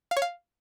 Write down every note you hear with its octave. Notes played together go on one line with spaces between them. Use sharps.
F5
C#5
F5